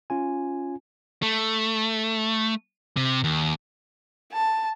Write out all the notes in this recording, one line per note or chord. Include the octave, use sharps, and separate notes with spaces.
C#4 F4 G#5
A3
C3
D#2
A5